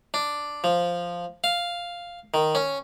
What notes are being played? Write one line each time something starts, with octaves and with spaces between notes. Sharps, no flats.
D4
F3
F5
D#3
C#4